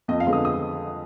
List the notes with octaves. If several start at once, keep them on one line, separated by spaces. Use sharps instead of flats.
F2 D#5
F5
D3 G#3 B3
D#6
D#6